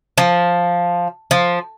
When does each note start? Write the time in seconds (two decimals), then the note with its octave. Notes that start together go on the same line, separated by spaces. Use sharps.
0.18 F3
1.31 F3